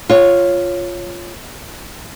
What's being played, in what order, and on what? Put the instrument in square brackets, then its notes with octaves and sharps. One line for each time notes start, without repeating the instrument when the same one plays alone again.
[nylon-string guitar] F4 C#5